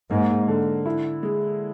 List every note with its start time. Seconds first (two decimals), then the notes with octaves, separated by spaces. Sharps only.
0.11 G#2 A#3
0.48 D3
0.86 E4
1.23 G#3